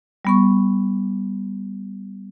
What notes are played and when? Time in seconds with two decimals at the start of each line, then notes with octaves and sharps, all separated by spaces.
0.25 G3 B3 C#6